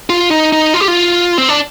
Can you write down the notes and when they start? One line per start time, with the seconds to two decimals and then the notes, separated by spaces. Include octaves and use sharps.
0.10 F4
0.31 D#4
0.52 D#4
0.74 F4
0.80 G4
0.88 F4
1.38 C4
1.49 D4